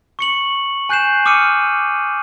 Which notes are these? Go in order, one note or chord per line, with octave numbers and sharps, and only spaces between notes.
C#6 C#7 F#7
G#5 F#6 G6 C7 E7
D6 D#6 F6 C#7 D#7